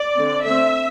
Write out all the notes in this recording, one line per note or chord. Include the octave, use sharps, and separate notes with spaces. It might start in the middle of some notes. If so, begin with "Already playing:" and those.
Already playing: D5
D3 A3 C4
D3 A3 C4 E5